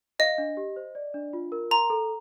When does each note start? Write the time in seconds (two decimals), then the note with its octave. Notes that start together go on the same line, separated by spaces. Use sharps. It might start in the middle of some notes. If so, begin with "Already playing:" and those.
0.19 D#5 F5
0.38 D4
0.57 G4
0.76 C5
0.95 D5
1.14 D4
1.33 F4
1.52 A#4
1.71 A#5 C6
1.90 A4